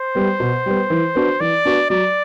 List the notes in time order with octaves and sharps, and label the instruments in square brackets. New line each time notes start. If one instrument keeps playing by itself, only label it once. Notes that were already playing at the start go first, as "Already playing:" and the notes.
Already playing: [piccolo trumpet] C5
[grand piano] G3 B3
B2
G3 B3
E3
B3 D4 F#4
[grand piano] E3 [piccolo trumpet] D5
[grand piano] B3 D4 F#4
[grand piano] F#3 [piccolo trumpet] D5